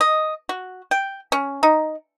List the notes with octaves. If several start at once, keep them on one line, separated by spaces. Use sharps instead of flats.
D#5
F#4
G5
C#4
D#4